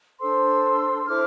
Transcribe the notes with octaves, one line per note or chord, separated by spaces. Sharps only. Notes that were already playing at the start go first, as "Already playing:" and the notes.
D4 A4 C5 C6 E6
E4 A4 C5 D6 F6